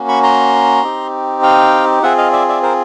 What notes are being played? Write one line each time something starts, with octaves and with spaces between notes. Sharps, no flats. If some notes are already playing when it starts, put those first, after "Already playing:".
Already playing: A#3 C#4 F#4
B5 C#6
A#5 C6
C4 D#4 G4
F5 G5
C4 F4 G#4 E5 F#5
D#5 F5
D5 E5
D5 E5
A#4 C5